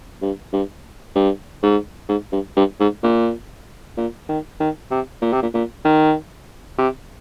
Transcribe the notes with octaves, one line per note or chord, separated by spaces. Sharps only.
G2
G2
G2
G#2
G#2
G2
G2
G#2
A#2
A#2
D#3
D#3
C3
A#2
C3
A#2
A#2
D#3
C3